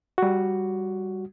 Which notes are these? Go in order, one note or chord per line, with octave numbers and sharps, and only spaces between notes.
G3 F#4